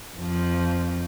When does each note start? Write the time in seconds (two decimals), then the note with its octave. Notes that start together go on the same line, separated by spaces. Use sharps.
0.16 F2 F3